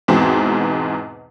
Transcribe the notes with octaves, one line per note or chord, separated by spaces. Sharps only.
E2 G#2 B2 C4